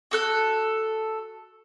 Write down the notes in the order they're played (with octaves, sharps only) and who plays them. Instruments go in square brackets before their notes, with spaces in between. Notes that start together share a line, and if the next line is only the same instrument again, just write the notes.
[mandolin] F#4 A4 F#6